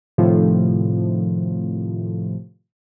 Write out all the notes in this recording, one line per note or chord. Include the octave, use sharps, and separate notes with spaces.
A2 C3 D#3 F3